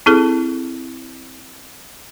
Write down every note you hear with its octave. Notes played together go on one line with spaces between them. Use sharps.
C4 E4 G#4 A4